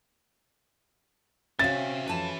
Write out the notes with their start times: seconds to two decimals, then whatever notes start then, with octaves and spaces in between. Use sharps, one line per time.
1.59 C3 C#4 F#4 C5 E5 F5 A6
2.08 F2 E4 F4 B4 A5